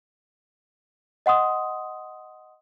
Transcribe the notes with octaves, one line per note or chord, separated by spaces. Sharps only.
D#5 F#5 C6 D#6